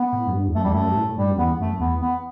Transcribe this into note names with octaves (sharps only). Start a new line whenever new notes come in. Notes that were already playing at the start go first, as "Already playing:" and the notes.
Already playing: B3
A2
F#2
G2
E2
F#2 A3
E2 G3
F#2 A3
G2
A2
G2 G3
F#2
E2 B3
F#2 A3
E2 B3
B3